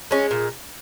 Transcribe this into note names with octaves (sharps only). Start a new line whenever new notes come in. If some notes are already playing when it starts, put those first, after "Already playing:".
G#3 C#4
A#2